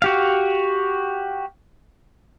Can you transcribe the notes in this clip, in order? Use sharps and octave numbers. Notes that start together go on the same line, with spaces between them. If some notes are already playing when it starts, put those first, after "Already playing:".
F#4 G4 F5